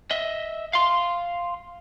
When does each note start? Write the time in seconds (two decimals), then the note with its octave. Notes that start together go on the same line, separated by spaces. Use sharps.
0.11 D#5 E5
0.73 F5 C6